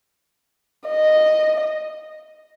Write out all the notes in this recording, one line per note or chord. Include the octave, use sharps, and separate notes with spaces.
D#5